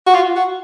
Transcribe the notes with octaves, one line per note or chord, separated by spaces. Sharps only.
F#4
F4
F#4